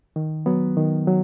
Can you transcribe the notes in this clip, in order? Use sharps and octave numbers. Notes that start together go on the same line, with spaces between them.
D#3
F#3 B3
D#3
F#3